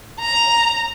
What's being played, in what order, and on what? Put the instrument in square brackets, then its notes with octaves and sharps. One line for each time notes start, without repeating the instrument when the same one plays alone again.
[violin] A#5